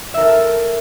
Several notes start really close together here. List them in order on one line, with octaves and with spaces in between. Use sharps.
E5 A#4 A4